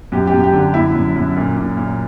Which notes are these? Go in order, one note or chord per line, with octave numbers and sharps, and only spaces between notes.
F#2 G4
G4
F#2
G4
D3
F#2 E4
F#2
F#2
A#2
A#2
A#2